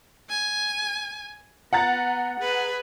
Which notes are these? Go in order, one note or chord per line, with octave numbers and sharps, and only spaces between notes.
G#5
B3 F#5 A#5 A6
G#4 B4